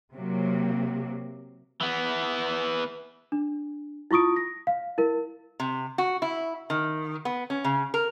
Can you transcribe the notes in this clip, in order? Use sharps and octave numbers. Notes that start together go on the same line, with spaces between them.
C3 F#3 A#3
E3 B3
D4
E4 F4 C#6 D#6 D7
A#6
F5
E4 A#4
C3
F#4
E4
D#3
B3
C#4
C#3
A#4